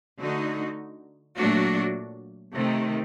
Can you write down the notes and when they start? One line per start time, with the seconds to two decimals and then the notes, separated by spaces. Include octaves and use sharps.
0.20 D3 A3 D#4 F#4
1.37 A#2 F#3 A3 D4 F#4
2.52 C3 D#3 A3